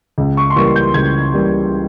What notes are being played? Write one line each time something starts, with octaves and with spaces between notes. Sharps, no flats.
C#2
C#6
C6
C#3 E3 G3 A#3 C#6
G6
C#2 G#6
C#3 E3 G3 A#3